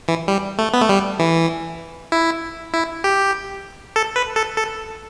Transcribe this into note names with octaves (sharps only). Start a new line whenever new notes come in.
E3
G3
A3
B3
A3
G3
E3
E4
E4
G4
A4
B4
A4
A4